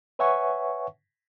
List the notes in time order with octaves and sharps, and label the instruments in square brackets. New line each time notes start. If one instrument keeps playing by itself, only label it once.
[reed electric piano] B4 C#5 E5 F#5 G#5 C#6